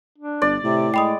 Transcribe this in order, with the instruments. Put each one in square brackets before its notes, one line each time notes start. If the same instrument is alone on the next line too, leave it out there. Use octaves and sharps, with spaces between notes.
[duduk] D4
[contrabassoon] G1 [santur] D5
[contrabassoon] A2 [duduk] C3
[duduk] G#3 [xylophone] G5 B5 D#6